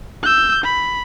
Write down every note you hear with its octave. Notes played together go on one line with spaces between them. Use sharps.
E6 G6
B5